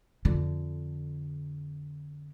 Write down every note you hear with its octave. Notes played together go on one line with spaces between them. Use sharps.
F2 D3